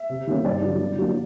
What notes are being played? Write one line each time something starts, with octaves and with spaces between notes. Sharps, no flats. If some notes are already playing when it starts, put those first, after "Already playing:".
Already playing: E5
C3
D#3 G3 A#3 C#4
G2 D5
D3 F#3
D3
F#3 A#3 D4